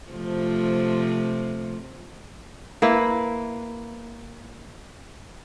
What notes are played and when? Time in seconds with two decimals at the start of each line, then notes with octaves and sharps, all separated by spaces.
0.10 C3 F3 A3
2.82 A#3 E4 B4